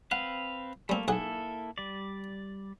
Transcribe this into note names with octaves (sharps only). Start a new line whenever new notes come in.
C4 B4 F5 F#5
G3 A3 A#3 C4
B1 A#3 E4 G#4 A4 F#5
G3 D5